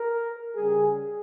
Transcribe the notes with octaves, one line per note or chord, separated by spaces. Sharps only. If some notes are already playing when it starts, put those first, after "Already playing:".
Already playing: A#4
C#3 G3 G#4